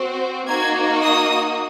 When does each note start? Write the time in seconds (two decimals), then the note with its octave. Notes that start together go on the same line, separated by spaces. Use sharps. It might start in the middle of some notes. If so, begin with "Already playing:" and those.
Already playing: C4 F#4
0.47 A#3 D#4 F#4 G#6
1.01 D#6